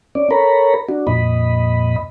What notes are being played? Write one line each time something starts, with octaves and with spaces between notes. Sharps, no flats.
C#4 D5
A4 A#4 C#5 A#5 B5
D4 F#4
F2 A#2 D#5 B5